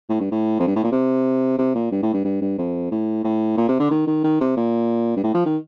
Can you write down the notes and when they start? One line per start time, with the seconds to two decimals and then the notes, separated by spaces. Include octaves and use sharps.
0.09 A2
0.20 G2
0.32 A2
0.59 F2
0.67 G2
0.76 A2
0.84 A#2
0.92 C3
1.58 C3
1.75 A#2
1.91 G2
2.03 A2
2.14 G2
2.25 G2
2.41 G2
2.58 F2
2.91 A2
3.24 A2
3.58 A#2
3.68 C3
3.80 D3
3.91 D#3
4.07 D#3
4.24 D#3
4.41 C3
4.57 A#2
5.17 G2
5.23 A2
5.34 F3
5.46 D#3